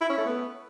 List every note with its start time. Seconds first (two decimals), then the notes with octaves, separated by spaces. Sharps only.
0.01 E4
0.09 C#4
0.18 A3
0.26 B3